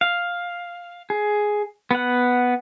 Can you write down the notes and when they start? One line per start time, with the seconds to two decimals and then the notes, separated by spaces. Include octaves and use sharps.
0.01 F5
1.10 G#4
1.91 B3 F#5